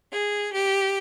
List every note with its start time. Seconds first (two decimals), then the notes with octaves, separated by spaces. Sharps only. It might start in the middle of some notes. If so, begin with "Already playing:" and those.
0.12 G#4
0.53 G4